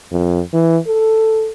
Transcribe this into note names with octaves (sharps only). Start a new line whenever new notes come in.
F2
E3
A4